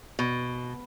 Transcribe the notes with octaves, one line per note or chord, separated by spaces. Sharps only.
B2